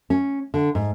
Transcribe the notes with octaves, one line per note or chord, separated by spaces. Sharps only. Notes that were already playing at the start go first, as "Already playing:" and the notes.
C#4
D3
G#2